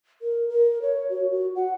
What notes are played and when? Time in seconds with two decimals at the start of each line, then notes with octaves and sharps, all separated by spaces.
0.22 A#4
0.49 A#4
0.82 C#5
1.10 F#4
1.31 F#4
1.56 F#5